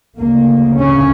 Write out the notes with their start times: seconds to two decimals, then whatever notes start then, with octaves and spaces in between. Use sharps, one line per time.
0.19 D2 C#3 A#3
0.78 C#4